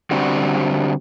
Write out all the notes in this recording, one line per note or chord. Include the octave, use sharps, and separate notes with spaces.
D3 G3 C4 F#4